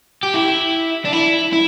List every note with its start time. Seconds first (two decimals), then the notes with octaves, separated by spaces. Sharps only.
0.23 G4
0.34 E4
1.05 D4
1.13 E4
1.53 E4